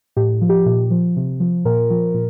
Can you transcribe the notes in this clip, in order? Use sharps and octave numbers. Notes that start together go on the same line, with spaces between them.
A2 G4
F3
G4
A#2
F3
C3
F3
A#2 A#4
F3
A#2